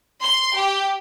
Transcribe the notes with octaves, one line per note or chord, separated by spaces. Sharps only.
C6
G4